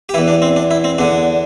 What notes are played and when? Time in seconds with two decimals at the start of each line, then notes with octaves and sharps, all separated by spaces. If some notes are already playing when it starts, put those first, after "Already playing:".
0.09 G4
0.14 E3 E4
0.18 E2
0.28 D4
0.42 C4
0.56 D4
0.71 E4
0.84 C4
0.98 E2 D3 D4